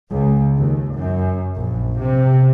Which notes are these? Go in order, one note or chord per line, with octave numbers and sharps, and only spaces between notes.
C#2
D#2
F#2
A#1
C3